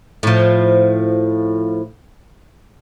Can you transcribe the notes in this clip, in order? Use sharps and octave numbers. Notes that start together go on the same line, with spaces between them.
A2 F3